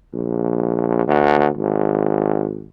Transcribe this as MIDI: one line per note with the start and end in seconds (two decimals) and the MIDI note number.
0.13 1.05 34
1.08 1.49 38
1.57 2.69 32